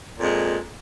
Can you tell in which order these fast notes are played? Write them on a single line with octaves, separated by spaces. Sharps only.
A#2 F2 G#3